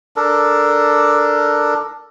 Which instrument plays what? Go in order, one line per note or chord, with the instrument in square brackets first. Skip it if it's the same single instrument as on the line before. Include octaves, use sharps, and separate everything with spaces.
[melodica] D4 A4 A#4